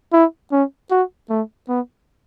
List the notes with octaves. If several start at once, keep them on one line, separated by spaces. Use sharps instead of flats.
E4
C#4
F#4
A3
B3